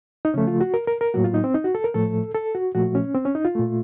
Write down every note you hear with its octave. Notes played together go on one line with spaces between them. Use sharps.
D#4
C#3 F3 A3 C#4
F4
F#4
A#4
A#4
A#4
A2 F#3 A#3 F#4
F4
D#4
C4
D#4
F#4
A4
A#4
A2 F3 A3 A4
A4
F#4
A#2 F3 A3 F#4
C#4
C4
C#4
D#4
F4
A#2 A3